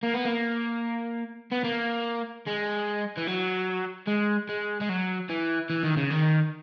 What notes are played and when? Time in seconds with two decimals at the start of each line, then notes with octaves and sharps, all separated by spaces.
0.03 A#3
0.14 B3
0.26 A#3
1.52 B3
1.64 A#3
2.47 G#3
3.17 E3
3.27 F#3
4.08 G#3
4.49 G#3
4.81 G#3
4.89 F#3
5.29 E3
5.70 E3
5.83 D#3
5.97 C#3
6.10 D#3